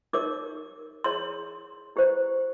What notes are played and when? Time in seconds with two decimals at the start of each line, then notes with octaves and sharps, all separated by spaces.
0.13 D#4 G4 A#4 C#5 D6
1.04 E4 G#4 C#5 C6
1.96 E4 G4 C5